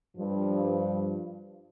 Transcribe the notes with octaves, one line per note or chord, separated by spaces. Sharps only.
G2 F3